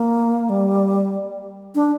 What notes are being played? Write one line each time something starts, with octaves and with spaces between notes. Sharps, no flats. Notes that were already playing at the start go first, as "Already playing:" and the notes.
Already playing: A#3
G3
D4